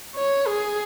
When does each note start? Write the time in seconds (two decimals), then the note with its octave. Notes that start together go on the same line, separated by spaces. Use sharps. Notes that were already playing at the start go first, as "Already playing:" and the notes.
0.16 C#5
0.47 G#4